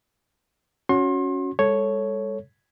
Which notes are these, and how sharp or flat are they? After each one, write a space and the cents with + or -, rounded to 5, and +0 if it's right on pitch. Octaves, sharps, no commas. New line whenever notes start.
C#4 +0 F#4 -10 C6 +35
G#3 -40 A4 +0 C#5 +0